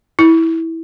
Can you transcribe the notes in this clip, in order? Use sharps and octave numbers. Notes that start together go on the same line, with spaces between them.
E4